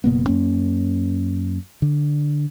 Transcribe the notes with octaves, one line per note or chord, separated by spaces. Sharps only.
F#1 B2 A#3 B3
F#2 A#3 C#4
D3